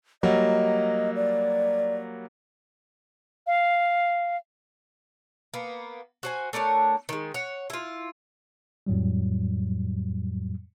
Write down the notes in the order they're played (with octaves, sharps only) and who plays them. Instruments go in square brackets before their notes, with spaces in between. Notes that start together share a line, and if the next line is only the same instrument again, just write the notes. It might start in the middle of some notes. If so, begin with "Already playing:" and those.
[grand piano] F#3 G3 A#3 [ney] D#5
[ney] D5
[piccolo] F5
[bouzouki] A#3 B3
F#4 C5 G#5
A3 D4 A#4 C#5
D#3 G#3
C#5 F#5
E4 F4
[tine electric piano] F2 A2 F#3 G3